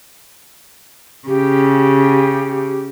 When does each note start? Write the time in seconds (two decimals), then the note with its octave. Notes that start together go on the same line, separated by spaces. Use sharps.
1.28 C#3 G4